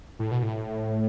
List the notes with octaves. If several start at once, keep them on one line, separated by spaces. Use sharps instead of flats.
A2
B2
A2